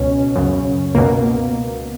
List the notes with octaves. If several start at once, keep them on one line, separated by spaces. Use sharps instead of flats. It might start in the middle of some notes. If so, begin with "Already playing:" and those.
Already playing: C#2 B2 C#4
F#2 C#3
C#2 B2 A#3